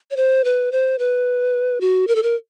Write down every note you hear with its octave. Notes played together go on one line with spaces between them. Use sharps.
C#5
C5
B4
C5
B4
F#4
A#4
A4
A#4